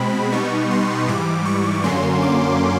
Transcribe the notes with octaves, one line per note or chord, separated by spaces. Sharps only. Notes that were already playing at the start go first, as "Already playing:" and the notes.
Already playing: B2 G#3 C4 B5
B2 G3 B3 D#4 C#6
C6
G#2 E3 G3 D6
C#6
F#2 D3 F#3 A#3 C#4 C6
D6